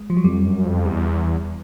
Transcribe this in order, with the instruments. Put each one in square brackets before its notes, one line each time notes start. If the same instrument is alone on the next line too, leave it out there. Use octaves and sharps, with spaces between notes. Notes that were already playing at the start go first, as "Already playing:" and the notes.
Already playing: [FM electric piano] G#3
F3
F#3
[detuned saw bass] F2 [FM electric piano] G3
[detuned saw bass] F#2
F2
[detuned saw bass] E2 [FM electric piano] G3